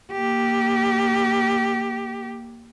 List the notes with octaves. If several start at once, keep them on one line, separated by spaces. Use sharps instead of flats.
A#3 G4